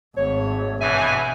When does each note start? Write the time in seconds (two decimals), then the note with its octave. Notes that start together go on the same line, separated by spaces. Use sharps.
0.17 G#1 A3 C#5
0.80 G2 B2 E3 E5 G#5